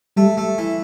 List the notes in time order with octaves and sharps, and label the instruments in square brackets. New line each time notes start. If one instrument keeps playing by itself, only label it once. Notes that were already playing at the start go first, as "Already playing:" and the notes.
[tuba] G3 [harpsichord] A3
[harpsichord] A3
E3